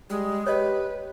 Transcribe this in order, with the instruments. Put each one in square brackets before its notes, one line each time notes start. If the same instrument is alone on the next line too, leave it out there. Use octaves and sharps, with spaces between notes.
[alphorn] G3 [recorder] G#3
[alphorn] G4 [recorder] B4 [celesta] C#5 D#5